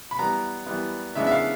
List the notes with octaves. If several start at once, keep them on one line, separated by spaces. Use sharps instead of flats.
B5
E3 G3 B3 A#5
E3 G3 B3
C#3 E3 G#3 B3 D4 E5
E5
F5